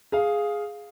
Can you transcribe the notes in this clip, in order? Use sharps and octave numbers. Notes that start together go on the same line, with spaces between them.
G#4 F5